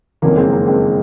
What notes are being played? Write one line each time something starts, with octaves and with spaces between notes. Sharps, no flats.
F#1 F2 D#3 A#3 C#4
G#3 C4
A#3
G#3 C4